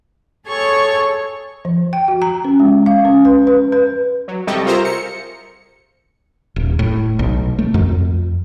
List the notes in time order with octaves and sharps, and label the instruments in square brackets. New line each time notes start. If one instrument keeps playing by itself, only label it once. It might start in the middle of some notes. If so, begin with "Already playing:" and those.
[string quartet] G#4 A4 C#5 C#6 G#6
[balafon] F3
G5
F#4
A#5
C#4
G#3
F5
C#4
B4
B4
B4
[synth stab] F#3
C3 G3 G4 A4 D#5 C#6
F4 G#4 A#4 C5 E5 A#5
C#7
[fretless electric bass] D#1
A2
B1
A3
F2